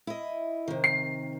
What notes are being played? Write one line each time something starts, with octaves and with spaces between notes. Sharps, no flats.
E4 D#5
C3 D#3
C7